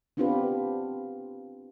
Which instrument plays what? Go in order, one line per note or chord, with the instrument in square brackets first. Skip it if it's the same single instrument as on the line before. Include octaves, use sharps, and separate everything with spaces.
[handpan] B3 C4 D4 F4 G4 B4